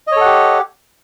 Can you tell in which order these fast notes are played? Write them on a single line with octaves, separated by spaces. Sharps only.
D#5 C#5 A4 F#5 G4